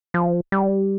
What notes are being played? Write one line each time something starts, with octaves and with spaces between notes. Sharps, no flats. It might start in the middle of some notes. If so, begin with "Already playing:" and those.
F3
G3